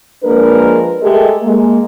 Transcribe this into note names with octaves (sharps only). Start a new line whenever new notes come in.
F3 G#3 A#3 D4 A#4 B4
G#3 A3 G4 A#4
G#3 A#3